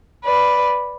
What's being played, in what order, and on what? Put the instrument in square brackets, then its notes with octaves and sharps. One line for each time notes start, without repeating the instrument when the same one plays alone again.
[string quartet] B4 D5